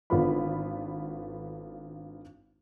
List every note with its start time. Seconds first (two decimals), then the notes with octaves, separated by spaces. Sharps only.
0.10 G#1 D3 B3 F4 B5